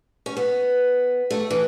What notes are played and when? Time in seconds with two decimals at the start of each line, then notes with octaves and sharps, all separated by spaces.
0.26 C#4
0.37 B3
1.31 A3
1.50 E3